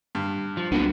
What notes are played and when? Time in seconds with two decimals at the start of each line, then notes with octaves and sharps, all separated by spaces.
0.15 G2
0.57 F3
0.72 C#2 F#3 A#3 B3 D4